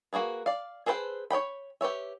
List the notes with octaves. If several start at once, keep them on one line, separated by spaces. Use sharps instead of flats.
A#3 F#4 G#4 B4
D5 F5
G#4 A4 B4 C5 G5
C#5 D5 G5 B5
G4 B4 C#5 E5